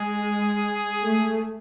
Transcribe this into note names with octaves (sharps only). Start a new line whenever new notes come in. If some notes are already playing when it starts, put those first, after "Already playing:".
Already playing: G#3 G#4
A3